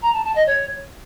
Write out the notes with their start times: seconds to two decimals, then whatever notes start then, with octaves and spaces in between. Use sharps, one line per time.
0.02 A#5
0.13 A5
0.24 A5
0.36 D#5
0.47 C#5